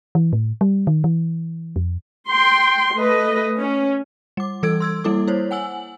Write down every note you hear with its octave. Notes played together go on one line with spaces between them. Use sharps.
E3
A2
G3
D#3
E3
F2
G5 C6
A3 B4 D#5
C#4
G3 D6
E3 G3 A4 E6 G#6 D7
C6 E6 G#6
G3 A#3 E4 A4 D6
E4 C5 C#5
F#5 G#5 E6 F#7